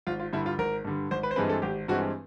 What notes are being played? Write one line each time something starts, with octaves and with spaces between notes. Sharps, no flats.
G#1 F4
F4
G2 D3 G3 E4
F4
G#1 A#4
G2 D3 G3
G#1 C5
B4
C5
G2 E3 G#3 C4 B4
A4
G#1 G4
G2 E3 G#3 C4 F#4